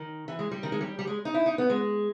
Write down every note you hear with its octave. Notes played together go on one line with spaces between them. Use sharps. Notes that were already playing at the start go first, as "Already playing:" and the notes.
Already playing: D#3
E3
G#3
G3
D#3
G#3
G3
G3
G#3
D#4
E4
D#4
B3
G#3